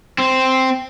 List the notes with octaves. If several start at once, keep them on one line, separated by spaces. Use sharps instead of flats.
C4